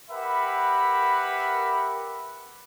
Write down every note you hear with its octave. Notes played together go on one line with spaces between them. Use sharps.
G4 A#4 B4 E5 F#5 B5